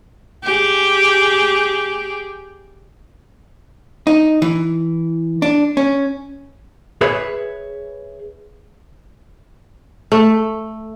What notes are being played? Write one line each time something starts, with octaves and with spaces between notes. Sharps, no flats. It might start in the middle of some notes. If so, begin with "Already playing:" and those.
G4 G#4
D#4
E3
D4
C#4
G#4 B4 C#5 E5
A3